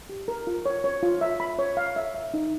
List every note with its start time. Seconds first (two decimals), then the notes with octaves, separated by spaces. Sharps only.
0.09 G4
0.28 A#4
0.47 F4
0.66 C#5
0.84 C#5
1.03 F4
1.21 E5
1.40 B5
1.59 C#5
1.77 F5
1.96 E5
2.15 E5
2.34 D#4